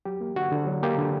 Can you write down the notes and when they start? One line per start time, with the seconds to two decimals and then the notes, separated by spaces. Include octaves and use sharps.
0.05 F#3 G4
0.21 A#3
0.36 D3 F#4
0.52 D3
0.67 F#3
0.83 A#3 G4
0.98 D3